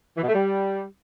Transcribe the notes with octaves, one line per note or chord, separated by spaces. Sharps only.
E3
B2
A3
G3